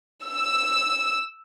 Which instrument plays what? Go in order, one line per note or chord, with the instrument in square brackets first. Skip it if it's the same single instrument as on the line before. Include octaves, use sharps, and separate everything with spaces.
[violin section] E6